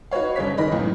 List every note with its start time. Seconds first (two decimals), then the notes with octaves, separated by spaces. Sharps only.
0.11 D#4 F#4 B4 C#5 F5
0.36 G1 C#3 C#5 B6
0.57 D#3 E3 A#4 D#5 B5 A#6
0.72 C#2 F#2 A2 E3 B3